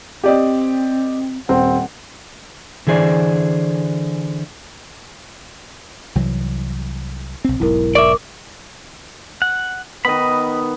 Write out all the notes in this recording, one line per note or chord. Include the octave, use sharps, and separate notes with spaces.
C4 G4 D5 D#5
D#1 C4 F#5
D3 E3 G#4 C5 D5
C2 E3 F#3
B1 C4
E1 B1 G#2 E4 A#4
A#4 D5 E5 C#6 D6
F#5
D#3 B3 D#5 B5